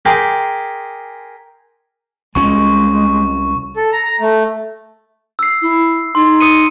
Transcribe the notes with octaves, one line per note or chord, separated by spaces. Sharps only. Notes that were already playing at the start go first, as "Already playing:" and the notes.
G#4 A#4 G5 B5 C6 D6
C2 F3 G#3 C#4 C#6
A4
A#5
A#5
A3
E6 C7
E4
D#4 C6
D#6 C#7 D#7